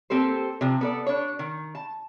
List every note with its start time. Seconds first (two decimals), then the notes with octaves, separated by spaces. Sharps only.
0.10 A#3 C4 G4 A4 C5
0.61 C3 F3
0.81 B3 A4 D5
1.06 D4 C#5
1.39 D#3
1.75 A5